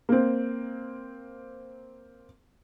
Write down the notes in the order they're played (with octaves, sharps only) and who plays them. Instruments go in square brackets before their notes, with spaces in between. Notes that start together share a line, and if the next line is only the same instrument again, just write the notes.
[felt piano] A#3 C4